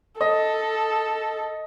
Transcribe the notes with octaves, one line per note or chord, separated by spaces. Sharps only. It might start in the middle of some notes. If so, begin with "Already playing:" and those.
A4 D#5